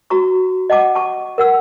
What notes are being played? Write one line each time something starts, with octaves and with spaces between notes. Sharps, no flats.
F#4 A#5 C#6
D#5 F#5 A5 D6
A5 C#6
A#4 F#5 E6